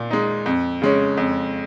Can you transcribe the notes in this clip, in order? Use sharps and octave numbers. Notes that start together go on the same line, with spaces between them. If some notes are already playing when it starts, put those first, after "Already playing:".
Already playing: A#2
G#3 D#4
F2
C#3 G#3 C#4
F2